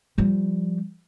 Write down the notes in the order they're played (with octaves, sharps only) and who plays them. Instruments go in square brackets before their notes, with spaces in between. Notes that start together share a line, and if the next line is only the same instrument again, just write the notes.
[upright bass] F3 G3